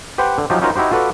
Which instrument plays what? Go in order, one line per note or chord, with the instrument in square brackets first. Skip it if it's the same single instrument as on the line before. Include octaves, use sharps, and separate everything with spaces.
[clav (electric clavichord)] G4 B4 C5 F#5 G5
D3
F3 F#3 D#4 F4 G4
C#4 D#4 F4 F#4 A#4 C5
D#4 E4 F#4 G4 C5
F4 F#4 A4 B4 D5